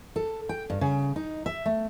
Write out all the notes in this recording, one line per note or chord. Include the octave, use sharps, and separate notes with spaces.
A4
G5
G2
C#3
D#4
E5
A3